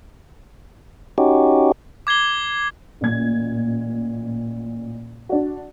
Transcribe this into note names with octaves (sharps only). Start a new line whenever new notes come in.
C#4 D#4 F#4 G4
D6 G#6 C7 G7
A1 A#2 G#6
D4 F#4